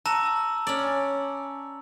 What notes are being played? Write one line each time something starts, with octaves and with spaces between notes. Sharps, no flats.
F#4 A5 A#5 E6
C#4 D5